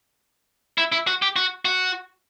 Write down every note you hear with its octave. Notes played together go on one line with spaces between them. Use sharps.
E4
E4
F#4
G4
F#4
F#4